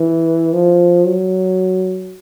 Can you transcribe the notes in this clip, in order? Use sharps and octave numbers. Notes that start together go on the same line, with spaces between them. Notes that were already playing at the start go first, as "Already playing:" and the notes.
Already playing: E3
F3
F#3